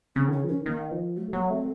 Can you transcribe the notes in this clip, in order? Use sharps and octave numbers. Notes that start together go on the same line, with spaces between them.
C#3 C4
D#3
C#3 C#4
F3
D#3 C#4
D#3 A#3
F3
F#3 A3
A3
F#3 A#3
A3 C4